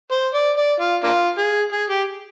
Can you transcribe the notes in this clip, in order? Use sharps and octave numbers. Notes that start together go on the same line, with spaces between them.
C5
D5
D5
F4
A#3 D4 F4
G#4
G#4
G4